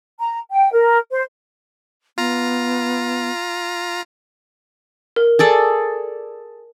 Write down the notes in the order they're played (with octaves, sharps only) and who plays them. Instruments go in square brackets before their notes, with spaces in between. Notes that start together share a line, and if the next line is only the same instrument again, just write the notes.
[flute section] A#5
G5
A#4
C5
[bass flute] B3 [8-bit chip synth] F4 A#5
[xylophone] A#4
[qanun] G#4 A4 D5